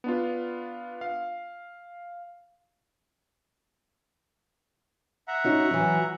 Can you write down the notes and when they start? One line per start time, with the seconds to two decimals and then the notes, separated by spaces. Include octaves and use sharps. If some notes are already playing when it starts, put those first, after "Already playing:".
0.04 B3 D4 F4
1.01 F5
5.28 E5 F#5 A#5
5.44 C#4 D#4 F#4
5.71 E3 F#3